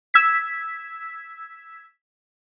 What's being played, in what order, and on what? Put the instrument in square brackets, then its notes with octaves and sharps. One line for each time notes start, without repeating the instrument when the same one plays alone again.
[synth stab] E6 G#6 B6